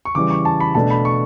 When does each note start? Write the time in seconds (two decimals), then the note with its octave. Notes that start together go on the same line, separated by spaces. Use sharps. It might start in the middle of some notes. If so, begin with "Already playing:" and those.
0.05 C#6
0.15 C#3 E3 G3 D6
0.30 C#6
0.45 A5
0.60 B5
0.75 B2 A3 D4 A5
0.90 B5
1.05 C#6